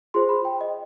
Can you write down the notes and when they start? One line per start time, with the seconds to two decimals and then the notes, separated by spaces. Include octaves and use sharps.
0.14 F4 G#4 C5 C6
0.29 B5
0.45 G5
0.61 D#5